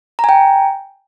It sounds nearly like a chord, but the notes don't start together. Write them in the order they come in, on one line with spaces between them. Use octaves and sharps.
A#5 G#5 G5